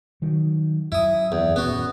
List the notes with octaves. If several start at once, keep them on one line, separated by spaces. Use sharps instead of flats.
D#3 F#3
F#2 E4 D#6
E2
D#1 B3 C#4 F#4